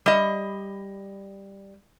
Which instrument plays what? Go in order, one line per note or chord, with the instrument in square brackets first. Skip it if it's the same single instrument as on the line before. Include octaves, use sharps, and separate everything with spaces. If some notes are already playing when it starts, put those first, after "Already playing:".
[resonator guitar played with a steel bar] G3 D#5